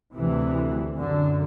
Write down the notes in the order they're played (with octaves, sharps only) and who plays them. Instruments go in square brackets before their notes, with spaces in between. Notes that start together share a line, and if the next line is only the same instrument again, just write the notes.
[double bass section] D2 C3 E3
F#2 D3